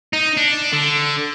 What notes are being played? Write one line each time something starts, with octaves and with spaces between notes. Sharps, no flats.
D#4
D4
D3